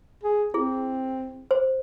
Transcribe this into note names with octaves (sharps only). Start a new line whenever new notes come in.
G#4
C4 E4 G#4
C5